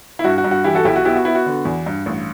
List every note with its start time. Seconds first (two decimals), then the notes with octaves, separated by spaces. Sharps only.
0.19 E4
0.24 G2 F#4
0.38 F#4
0.44 G2
0.51 F#4
0.64 E3 E4 G4
0.75 F#4 A4
0.85 B1 E4 G4
0.96 F#4
1.05 B3 E4 G4
1.16 F#4
1.25 B3 E4
1.35 F#4
1.46 D3
1.65 E2
1.86 G2
2.06 A1